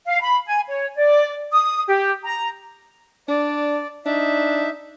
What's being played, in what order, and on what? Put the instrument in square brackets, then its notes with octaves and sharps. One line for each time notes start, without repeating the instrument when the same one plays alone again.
[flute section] F5
B5
G#5
C#5
D5
D#6
G4
A#5
[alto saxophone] D4 [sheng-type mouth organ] D5
[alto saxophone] D4 [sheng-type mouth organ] D#4 E5